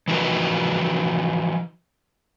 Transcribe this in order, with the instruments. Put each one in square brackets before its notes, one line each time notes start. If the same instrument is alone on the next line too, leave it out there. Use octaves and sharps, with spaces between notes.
[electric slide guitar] E3 F3 D#4 F#4 A#4 B4